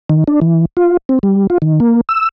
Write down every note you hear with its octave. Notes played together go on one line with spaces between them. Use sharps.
D#3
D4
E3
F4
C4
G3
F4
D#3
A#3
E6